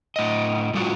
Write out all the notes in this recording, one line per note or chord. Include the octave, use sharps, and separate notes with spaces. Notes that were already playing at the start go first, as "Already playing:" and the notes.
A2 D#5
A2 G3 F4 F#4